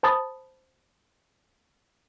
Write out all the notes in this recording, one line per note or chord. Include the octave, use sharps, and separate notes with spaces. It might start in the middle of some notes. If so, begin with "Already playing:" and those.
C5 A5 B5 D#6 A6